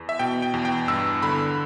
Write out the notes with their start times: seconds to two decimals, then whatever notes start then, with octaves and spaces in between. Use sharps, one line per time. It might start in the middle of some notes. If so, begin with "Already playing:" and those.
Already playing: E2
0.09 E5
0.19 B2 G5
0.42 G5
0.54 E2
0.65 G5
0.88 G2 E6
1.22 D3 B5